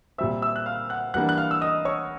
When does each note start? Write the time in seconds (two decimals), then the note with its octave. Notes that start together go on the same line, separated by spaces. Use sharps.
0.18 A#2 G3 C4 E5 E6
0.42 E5 E6
0.56 F#6
0.66 F5 F6
0.90 F#5 F#6
1.14 E3 G3 A#3 D4 F#5 F#6
1.29 F#6
1.38 F5 F6
1.51 E6
1.61 D#5 D#6
1.85 C#5 C#6